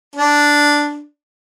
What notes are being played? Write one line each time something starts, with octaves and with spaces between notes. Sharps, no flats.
D4